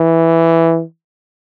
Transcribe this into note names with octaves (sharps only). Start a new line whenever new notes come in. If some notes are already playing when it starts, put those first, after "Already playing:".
Already playing: E3